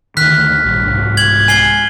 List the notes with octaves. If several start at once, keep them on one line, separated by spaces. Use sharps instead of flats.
D2 D#3 F6 F#6 B6
A#1 G2
C2 G#2
G#6 F#7
G#5 C7 G7